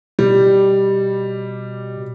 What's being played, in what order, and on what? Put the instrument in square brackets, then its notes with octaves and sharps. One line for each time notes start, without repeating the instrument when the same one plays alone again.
[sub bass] B2 [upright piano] G3